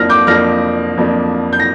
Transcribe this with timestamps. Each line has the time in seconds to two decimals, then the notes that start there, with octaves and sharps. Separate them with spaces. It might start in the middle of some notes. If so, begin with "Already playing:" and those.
Already playing: F2 F3 A#3 D4 F6 A#6
0.09 D6 G6
0.27 F2 F3 A#3 D4 F6 A#6
0.97 F2 F3 A#3 D4
1.53 G6
1.60 A#6